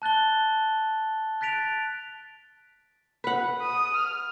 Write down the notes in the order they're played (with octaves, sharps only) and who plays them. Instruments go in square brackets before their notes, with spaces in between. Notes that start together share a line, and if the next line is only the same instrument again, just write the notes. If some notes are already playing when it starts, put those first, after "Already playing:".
[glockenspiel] A5 F#6 A6 G7
F#6 A6 B6 D7 F7
[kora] B4 F#5
[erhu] D#6
F6